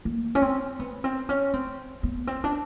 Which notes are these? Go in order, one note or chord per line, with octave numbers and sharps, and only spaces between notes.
A#3
C#4
C4
B3
C4
C#4
C4
B3
C4
D4